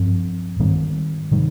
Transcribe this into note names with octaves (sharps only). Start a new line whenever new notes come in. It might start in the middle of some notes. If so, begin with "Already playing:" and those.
Already playing: G2 F3 C4
G#2 D#3 G3 C4
C3 D#3 G3